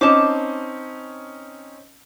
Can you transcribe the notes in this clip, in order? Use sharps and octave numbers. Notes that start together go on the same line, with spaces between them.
C4 C#4 D#4 A5 D6